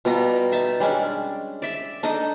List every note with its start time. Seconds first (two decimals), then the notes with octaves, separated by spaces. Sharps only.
0.05 B2 G3 F4 A#5
0.52 D#4 E5 A5
0.80 G3 G#3 C#4 D4
1.62 D5 E5
2.03 D4 D#4 A4 D#5